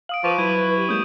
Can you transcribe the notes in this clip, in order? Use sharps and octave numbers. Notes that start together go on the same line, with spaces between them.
F5 D#6 D7 F#7
F3 B4 C#6 D6 D#7
F#3 E4
G4
G#3 A#3 C#4 D#6 G6 E7